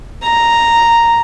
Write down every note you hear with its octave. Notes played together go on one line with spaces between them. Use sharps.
A#5